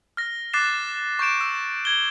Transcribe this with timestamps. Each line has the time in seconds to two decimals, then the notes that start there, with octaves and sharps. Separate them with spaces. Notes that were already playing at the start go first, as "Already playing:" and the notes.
0.17 F6 A#6
0.53 D6 F#6 A6 C7 E7
1.19 C#6 G6 D7 E7
1.41 E6
1.85 G#6 G7